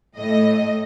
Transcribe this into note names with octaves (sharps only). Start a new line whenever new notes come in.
A2 A3 D#5